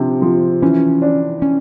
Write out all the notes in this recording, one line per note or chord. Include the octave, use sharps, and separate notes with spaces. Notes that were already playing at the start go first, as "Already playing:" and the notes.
Already playing: C3 F3 D4
F3
E3 C#4
D4
C#4